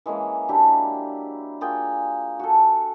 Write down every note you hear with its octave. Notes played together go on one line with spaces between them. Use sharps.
E3 G#3 A#3 C#4
F#3 D4 E4 G4
A#3 F4 G#4 G5
F#4 A4